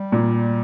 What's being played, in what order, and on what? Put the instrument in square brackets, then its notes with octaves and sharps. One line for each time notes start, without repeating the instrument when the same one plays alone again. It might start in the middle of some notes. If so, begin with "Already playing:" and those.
Already playing: [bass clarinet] G3
[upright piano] A#2